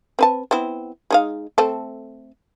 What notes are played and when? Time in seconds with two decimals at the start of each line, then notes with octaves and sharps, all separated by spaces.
0.19 C4 B4 A5
0.51 B3 C4 E4
1.11 G#3 D#4 F5
1.58 A3 C4 A4